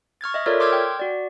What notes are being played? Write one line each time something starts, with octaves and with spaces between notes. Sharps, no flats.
C#6 F6 G#6 A6
D#5 E5
F4 A4 A#4 C#5 D5 E5
C6 D6 E6 F6 G6 G#6
G5
F#4 D5